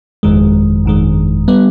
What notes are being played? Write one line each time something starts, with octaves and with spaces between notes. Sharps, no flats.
G1 F2 D#3 G#3
G1 F2 D#3 G#3
G3 B3